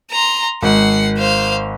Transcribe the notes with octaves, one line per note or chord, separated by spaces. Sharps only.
A#5 C6
G#1 F#5 C7
C5 F5